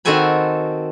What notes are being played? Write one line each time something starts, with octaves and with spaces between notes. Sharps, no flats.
D#3 C4 F#4 A4 G#5 B5